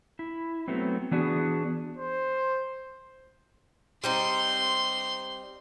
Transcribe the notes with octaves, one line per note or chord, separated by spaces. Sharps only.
E4
F#3 A3 B3 C4
E3 B3 D4 F#4 G#4
C5
G3 C4 D#4 C6